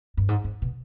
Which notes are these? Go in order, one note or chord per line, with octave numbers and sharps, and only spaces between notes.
G2
G#2
G#2
B2